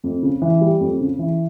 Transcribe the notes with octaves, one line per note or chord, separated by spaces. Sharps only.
F2
C#3
E3
G3
F2
C#3
E3